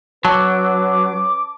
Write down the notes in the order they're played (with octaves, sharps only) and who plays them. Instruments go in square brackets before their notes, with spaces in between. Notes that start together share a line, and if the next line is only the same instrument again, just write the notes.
[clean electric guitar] F#3 [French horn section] C#4 B4 [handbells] A5 [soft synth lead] D6